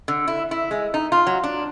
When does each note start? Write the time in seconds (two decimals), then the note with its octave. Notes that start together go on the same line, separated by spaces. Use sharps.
0.08 D3
0.28 E4
0.51 E4
0.71 G#3
0.94 D#4
1.12 F4
1.27 F#3
1.44 D4